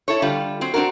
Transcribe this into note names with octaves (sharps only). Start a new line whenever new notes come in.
E4 A4 C#5
D3 G3 F4
F#3 C4
C4 D4 F#4 A#4